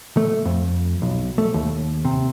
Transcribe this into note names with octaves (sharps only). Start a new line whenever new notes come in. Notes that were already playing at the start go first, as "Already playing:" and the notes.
A3
F2
B1
A3
D#2
C3